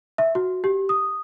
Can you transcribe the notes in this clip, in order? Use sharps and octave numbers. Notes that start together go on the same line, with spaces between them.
E5
F#4
G4
D#6